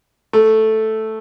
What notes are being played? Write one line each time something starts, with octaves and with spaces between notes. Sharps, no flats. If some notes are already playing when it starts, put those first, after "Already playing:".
A3